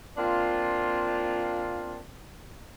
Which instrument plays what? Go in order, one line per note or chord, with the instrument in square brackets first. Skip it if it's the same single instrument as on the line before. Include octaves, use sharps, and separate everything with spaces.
[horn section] A#3 C4 D4 F4